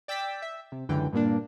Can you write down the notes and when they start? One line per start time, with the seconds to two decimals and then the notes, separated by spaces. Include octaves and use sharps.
0.08 D5 G5 E6 A6 B6
0.42 E5
0.72 C3
0.89 C#2 F#2 D3 E3 G5
1.13 G2 A#2 A#3 D4